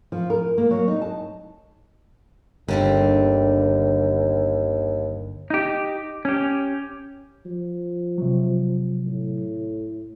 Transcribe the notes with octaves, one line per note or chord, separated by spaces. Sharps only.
F3
A#4
A#3
F#3
D#4
A5
G1 D#2 D3 G3 C4
D#4 G4
C#4 G4
F3
C3 F#3
A2